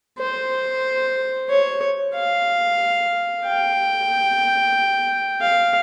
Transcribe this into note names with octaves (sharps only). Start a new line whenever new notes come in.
C5
C#5
F5
G5
F5